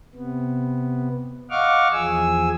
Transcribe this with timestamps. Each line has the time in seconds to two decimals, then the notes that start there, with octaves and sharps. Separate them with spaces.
0.14 C3 B3
1.50 D#5 F5 F#5 C#6 D6 F6
1.92 E2 F3 G#4 G#5 E6